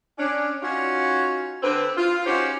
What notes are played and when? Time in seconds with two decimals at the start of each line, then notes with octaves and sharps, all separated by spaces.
0.18 C#4 D4
0.62 C#4 D#4 F4 F#4
1.63 D3 C4 B4
1.97 F4
2.26 C#4 D#4 F#4 G4 C5 C#5